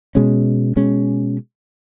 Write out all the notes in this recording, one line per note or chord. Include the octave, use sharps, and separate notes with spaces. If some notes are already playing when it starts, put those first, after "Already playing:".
B2 G#3 C#4
B2 G#3 C#4